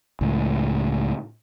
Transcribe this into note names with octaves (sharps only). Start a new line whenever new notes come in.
C#2 A2